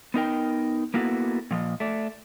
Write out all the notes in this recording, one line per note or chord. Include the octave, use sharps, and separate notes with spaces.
B3 D#4 A#4 G5
A#3 B3 E4 F#4 A4 B4
A#2 F3 D#5
A3 D5